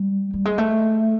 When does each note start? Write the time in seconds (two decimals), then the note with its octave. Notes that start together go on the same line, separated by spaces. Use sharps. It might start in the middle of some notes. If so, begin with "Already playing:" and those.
Already playing: G3
0.33 G3
0.45 G#3
0.58 A3